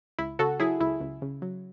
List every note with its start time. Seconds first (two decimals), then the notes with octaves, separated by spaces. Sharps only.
0.19 C#2 E4
0.39 C#3 F#4 A4
0.60 F#3 E4 G#4
0.80 C#2 E4
1.01 C#2
1.22 C#3
1.42 F#3